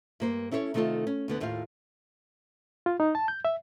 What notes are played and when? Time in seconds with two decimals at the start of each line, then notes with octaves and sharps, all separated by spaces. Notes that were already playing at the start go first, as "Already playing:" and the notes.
0.20 G2 A#3 C5
0.51 C#4 E4 A4 C5 C#5
0.74 C3 D#3 A3 D#4 F4 A4
1.07 C#4
1.28 D2 D3 B3
1.40 D#2 A2 F4 C5 F5
2.86 F4
3.00 D#4
3.15 A5
3.28 G6
3.45 E5